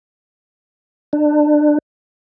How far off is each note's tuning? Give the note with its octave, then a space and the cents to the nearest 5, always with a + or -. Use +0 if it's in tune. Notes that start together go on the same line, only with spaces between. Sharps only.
D4 +25